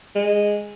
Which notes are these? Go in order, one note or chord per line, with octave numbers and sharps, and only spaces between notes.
G#3